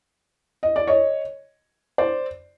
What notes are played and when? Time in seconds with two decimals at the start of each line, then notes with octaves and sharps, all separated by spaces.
0.63 D#5
0.76 D5
0.87 C#5 D#5
1.98 C5 D5